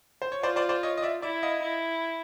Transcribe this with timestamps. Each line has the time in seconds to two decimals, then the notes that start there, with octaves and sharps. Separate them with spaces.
0.22 C5
0.32 C#5
0.43 F4 C5 D5
0.56 C5 D5
0.69 C5 D5
0.83 C#5 D#5
0.97 D#5
1.02 D5 E5
1.22 E4 D5 E5
1.43 D#5 F5
1.62 E4